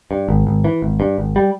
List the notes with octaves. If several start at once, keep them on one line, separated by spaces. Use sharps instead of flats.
G2
G#1
G#1
E3
G#1
G2
G#1
G3